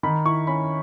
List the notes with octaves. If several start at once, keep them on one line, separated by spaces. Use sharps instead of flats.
D#3 B5
E4 C#6
C#4 B5